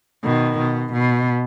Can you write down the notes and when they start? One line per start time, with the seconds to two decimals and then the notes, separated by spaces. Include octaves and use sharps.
0.24 B2 D#3
0.58 B2
0.93 B2